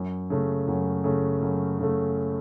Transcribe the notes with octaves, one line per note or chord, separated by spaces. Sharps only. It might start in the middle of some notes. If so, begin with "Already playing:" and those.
Already playing: F#2
C#3 A3
F#2
C#3 A3
F#2
C#3 A3